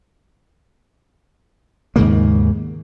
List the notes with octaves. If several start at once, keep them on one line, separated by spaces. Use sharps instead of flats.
D#2 G#2 C#3 A#3